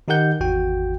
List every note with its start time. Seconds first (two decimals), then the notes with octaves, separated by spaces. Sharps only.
0.08 D#3 D#4 G4 A#4 F#5 G6
0.40 G#1 E2 F#4 G5